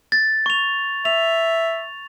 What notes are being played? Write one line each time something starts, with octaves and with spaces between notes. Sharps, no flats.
A6
C#6 F7
E5 F7